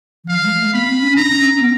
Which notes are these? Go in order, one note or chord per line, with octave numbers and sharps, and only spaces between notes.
E3
F3 F5
G#3
A3
B3 B5
C4
C#4
D4 A#5
C#4
C#4
B3